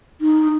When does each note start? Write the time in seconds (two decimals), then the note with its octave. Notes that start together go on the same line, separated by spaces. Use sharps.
0.21 D#4